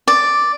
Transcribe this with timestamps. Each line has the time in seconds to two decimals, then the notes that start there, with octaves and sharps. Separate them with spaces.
0.07 D5